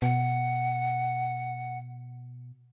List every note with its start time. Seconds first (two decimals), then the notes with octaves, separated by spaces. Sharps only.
0.02 B2 F#5